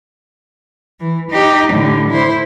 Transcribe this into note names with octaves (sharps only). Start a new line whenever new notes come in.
E3
D#4 G4
A2 D3
E4 C5